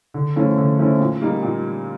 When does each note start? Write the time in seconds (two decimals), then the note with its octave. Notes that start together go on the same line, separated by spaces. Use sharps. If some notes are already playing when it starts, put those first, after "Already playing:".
0.14 D3
0.36 F3 A3 C#4 E4
0.58 D3
0.79 F3 A3 C#4 E4
1.00 A#2
1.22 G3 A#3 D#4
1.43 A#2